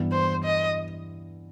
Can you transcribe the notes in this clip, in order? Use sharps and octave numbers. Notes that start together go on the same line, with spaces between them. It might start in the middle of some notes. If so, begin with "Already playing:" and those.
Already playing: G2 E3 B3 E4
C5
D#5